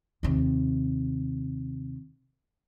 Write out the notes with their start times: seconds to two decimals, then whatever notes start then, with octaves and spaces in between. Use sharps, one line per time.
0.23 D#2 C3